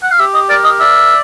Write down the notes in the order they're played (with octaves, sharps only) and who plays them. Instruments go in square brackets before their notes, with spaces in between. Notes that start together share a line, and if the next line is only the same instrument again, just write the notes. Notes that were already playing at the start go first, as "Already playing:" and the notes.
[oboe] F#5
F5
[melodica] G4 [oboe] E5
[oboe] D#5
[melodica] A#4 [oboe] D5
[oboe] D#5
[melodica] D5 [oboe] E5